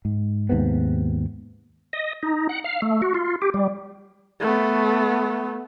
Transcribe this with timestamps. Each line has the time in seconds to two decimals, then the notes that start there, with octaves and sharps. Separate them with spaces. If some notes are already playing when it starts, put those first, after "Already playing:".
0.05 G#2
0.49 D#2 G#2 C3 B3
1.93 D#5
2.23 D#4
2.49 F#5
2.64 F5
2.82 A3
3.02 F#4
3.14 F4
3.42 G4
3.54 G3
4.41 A3 B3